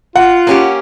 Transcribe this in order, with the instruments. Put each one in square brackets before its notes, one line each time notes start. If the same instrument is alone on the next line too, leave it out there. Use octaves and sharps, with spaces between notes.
[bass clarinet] F4 [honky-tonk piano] F#5
[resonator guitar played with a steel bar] A#3 C#4 G4